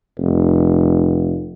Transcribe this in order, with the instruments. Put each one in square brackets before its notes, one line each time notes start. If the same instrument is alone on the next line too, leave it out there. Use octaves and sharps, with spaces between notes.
[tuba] F1